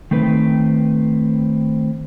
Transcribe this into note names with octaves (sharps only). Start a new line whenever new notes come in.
D#3 A3 C4 B4